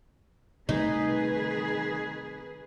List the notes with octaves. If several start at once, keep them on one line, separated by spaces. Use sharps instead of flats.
C3 D#3 G3 A3 D#4 G#4 B4